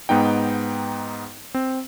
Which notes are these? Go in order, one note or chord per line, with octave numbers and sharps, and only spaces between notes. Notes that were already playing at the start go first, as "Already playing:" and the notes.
G#2 B3 D#4 G5
C4